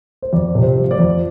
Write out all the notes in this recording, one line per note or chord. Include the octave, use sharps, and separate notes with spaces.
C5
F2 D5
C3
C5
F3
D5
F2